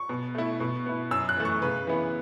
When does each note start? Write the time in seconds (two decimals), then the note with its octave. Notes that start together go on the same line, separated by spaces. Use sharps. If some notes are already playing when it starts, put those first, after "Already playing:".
Already playing: C#6
0.09 B2
0.35 A3 E4
0.60 B2
0.86 B3 E4
1.11 F#2 E6
1.29 F#6
1.37 E3 A3
1.45 C#6
1.62 C#3 B4
1.87 E3 B3 E4